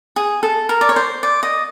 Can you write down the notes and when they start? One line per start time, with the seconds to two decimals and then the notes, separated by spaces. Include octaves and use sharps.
0.16 G#4
0.43 A4
0.69 A#4
0.81 D5
0.89 C#5
0.96 C5
1.23 D5
1.43 D#5